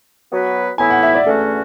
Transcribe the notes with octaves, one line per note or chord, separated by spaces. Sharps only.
F#3 B3 F#4 B4
A2 E3 B3 E4 G#5
F#5
E5
D5
E2 D3 A3 C#4 F#4 A4